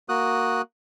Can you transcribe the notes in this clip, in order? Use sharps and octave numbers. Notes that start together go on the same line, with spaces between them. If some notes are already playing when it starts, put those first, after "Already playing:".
A#3 F#4 D#6 F#6